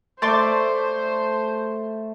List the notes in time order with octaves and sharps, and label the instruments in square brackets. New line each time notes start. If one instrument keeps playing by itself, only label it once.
[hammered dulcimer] A3 [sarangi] C5 [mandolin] D5 C6 D6